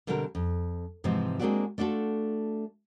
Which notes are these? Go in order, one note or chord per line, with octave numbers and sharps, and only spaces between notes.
B2 D3 G3 C4 G4 A#4
F2
G#2 C3 E3 F3 G#3 C4
G#3 A#3 C4 D4 F#4 G4
A3 D4 F4 F#4 A4